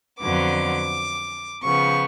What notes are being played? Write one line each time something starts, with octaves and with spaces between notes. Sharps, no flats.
F2 D3 F#3 B3 D6
C#3 F3 B3 C#6